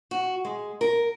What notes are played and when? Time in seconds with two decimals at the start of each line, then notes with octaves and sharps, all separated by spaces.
0.11 F#4
0.45 G#3
0.81 A#4